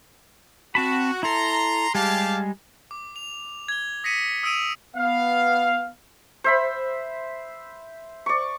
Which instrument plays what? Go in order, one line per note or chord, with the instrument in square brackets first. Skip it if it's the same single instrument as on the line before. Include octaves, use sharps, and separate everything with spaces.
[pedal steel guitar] C4 A5 B5 [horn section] F#4
[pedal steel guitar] E4 A4 [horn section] A#5 C6
[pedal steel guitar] G3 G#3 G#4 [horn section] G4 F5 A5
[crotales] D6
F7
G#6 G7
D#6 A#6 B6 C#7 D#7
D#6 E6 G#6 D7 D#7 F7
[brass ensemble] B3 F5
[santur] C5 E5 B5
D5 C#6